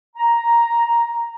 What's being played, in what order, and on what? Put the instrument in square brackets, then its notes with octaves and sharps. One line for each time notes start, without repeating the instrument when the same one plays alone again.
[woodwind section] A#5